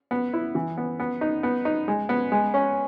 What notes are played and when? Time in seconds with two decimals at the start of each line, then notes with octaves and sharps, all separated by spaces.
0.11 B3
0.33 E4
0.55 E3
0.77 B3
1.00 B3
1.21 D#4
1.43 B3
1.65 D#4
1.88 G#3
2.09 B3
2.32 G#3
2.54 C#4